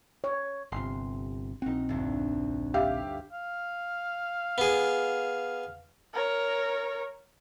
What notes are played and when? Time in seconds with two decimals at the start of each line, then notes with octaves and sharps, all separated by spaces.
0.24 C#5
0.72 G1 C3 C6
1.62 A#1 C4 D#4 F#4
1.89 G1 D2
2.74 G4 E5 F5
3.32 F5
4.58 B3 G#4
6.14 A#4 C#5